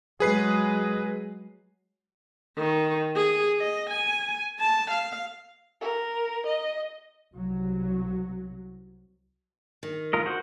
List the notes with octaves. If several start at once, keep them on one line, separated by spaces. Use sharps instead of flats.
F#3 G#3 G#4 B4 C7
D#3
G#4
D#5
G#5
A5
F5
A#4
D#5
C2 F#3
D#3
F4 A#4 D#5
F#4 C5